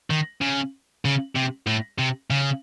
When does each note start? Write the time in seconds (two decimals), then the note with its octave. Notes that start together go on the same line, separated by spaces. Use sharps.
0.10 D#3
0.42 C#3
1.05 C#3
1.35 C3
1.67 A2
1.98 C3
2.30 C#3